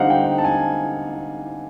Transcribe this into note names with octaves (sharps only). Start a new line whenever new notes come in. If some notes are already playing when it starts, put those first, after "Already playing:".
Already playing: D3 G3 C4 D#4 F5 F#5
G5
A5
G#5